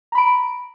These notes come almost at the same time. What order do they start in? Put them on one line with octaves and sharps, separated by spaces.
A#5 B5 D7